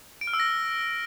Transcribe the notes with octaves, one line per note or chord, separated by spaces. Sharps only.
D7
F6
E6
A#6